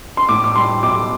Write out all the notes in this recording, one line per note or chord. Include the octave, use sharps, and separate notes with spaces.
C6
A2 D6
D6
G3 C6
B1 D6